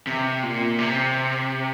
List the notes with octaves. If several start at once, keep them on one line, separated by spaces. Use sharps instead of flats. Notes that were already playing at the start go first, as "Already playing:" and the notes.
C3
A#2
C3